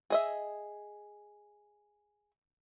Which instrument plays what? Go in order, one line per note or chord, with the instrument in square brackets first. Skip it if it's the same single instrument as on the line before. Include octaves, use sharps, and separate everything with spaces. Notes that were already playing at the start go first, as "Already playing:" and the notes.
[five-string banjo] G#4 D#5 E5